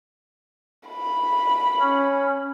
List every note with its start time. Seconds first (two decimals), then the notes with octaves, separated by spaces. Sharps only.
0.87 B5
1.73 C#4